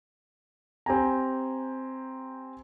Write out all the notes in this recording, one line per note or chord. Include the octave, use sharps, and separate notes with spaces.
C4 G4 G#5 A#5